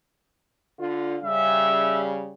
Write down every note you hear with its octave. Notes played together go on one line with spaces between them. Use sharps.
D3 F4
C#3 G3 E5